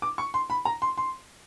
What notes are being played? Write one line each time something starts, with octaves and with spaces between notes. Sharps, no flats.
D6
C#6
C6
B5
A#5
C6
C6